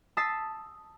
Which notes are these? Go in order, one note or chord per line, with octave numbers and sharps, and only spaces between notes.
A5 D#6 E6 A6 B6 C7